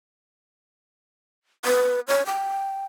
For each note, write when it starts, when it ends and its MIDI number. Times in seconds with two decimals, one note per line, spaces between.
1.65 2.00 71
2.08 2.23 73
2.26 2.86 79